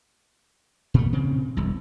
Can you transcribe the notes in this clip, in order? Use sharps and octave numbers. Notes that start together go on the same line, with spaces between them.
A#2 A3
C#3 C4
E1 C2